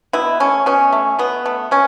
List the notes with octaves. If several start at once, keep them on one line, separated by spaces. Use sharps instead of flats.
B2 E4
A3 C#4
B2 C#4
A3
B2 B3
A3
B2 C#4